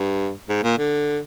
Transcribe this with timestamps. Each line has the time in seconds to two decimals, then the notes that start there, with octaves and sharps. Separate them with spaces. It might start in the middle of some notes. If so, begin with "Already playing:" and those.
Already playing: G2
0.49 G#2
0.63 A#2
0.78 D3